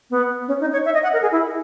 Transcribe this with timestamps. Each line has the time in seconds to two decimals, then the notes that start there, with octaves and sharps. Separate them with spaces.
0.10 B3
0.48 C#4
0.61 D#4
0.73 C#5
0.85 E5
0.94 D#5
1.03 F#5
1.13 A#4
1.22 G#4
1.32 E4